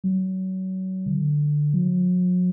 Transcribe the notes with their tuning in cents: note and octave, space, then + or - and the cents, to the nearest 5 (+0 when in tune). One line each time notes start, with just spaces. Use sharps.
F#3 +25
D3 +10
F#3 -40